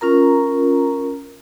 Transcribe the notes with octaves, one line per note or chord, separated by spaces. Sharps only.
C#4 F4 A#4 A#5